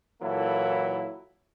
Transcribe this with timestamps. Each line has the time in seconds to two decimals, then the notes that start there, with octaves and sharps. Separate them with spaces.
0.22 A#2 E3 F#3 A#3 E4 A4